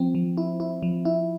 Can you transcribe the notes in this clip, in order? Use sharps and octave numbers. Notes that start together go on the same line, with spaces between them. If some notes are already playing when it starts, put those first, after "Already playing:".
Already playing: F3 C4
F3
E4
E4
F3
E4